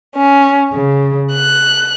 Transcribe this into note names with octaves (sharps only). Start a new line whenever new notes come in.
C#4
C#3
F#6